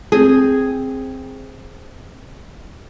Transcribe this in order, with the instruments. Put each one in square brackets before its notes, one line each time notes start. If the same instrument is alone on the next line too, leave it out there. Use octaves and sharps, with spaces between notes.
[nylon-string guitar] C4 G#4